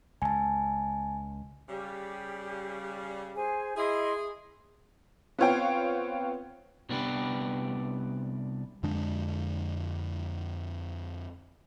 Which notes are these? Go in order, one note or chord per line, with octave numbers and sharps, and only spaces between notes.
C#2 G#5 A5
C#3 G3 G4
G#4 C5 G#5
E4 G#4 D#5 C6
B3 C4 F4 C#5 F5 G5
C2 B3 D4 G4 B4
F2 D3 G#3 D4